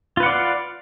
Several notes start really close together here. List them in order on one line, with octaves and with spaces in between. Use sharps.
F4 B4 F#5 D5 F5